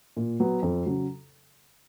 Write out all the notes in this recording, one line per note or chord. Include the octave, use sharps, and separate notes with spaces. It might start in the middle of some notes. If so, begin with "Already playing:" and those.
A#2
F#3 B3
F2
C#3 F#3